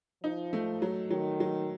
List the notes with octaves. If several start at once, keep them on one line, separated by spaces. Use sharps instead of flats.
F3 D#4
A3
F#3
D#3 F#3
F#3